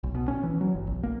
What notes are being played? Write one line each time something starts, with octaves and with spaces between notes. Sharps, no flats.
B1
B2
C#4
E3
F#3
G1
B1
A#3